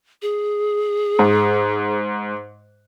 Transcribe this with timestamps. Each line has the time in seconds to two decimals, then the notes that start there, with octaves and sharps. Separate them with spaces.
0.22 G#4
1.19 G#2